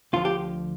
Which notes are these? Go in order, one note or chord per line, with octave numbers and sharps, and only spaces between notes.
D2 D3 F3 F4
G4